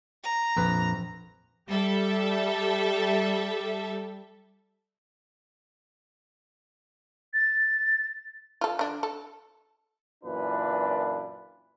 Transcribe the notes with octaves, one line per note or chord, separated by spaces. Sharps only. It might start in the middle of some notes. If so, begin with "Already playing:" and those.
A#5
A#1 F2 B4
G3 G4 A4 E5
A6
F4 A4
D3 D4
A4
F#2 A#2 E3 D4 F4 B4